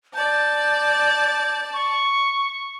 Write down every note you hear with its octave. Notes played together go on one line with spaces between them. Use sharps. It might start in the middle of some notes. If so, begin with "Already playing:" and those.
D5 A5 G6
C#6